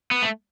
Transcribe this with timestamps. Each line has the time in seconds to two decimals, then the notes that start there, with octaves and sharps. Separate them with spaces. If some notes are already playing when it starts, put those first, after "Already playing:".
0.11 B3
0.22 A3